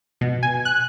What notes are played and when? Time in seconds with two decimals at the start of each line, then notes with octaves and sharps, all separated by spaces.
0.21 B2
0.43 G#5
0.65 F#6